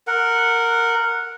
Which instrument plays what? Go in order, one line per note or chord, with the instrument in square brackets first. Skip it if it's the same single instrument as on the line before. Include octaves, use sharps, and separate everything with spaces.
[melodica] A#4 F#5